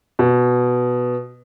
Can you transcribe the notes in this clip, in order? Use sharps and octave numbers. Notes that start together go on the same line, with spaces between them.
B2